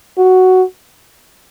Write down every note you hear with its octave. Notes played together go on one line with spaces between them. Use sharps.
F#4